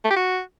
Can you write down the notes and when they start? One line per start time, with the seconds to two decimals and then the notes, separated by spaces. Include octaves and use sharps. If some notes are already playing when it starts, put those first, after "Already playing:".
0.04 A3
0.11 G4
0.17 F#4